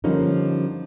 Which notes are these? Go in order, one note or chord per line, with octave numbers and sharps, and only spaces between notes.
D3 F3 G3 A#3 C#4 D#4